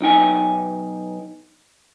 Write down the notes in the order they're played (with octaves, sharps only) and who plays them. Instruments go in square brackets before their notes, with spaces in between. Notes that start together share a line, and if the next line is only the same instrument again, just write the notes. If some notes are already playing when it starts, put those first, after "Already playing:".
[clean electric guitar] B1 D#4 G5 G#5